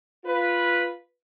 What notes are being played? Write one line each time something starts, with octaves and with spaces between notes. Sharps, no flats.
F4 B4